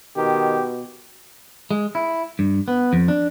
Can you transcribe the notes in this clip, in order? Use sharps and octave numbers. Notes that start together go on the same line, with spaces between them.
B2 D#3 G4
G#3
E4
G2
B3
F2
D4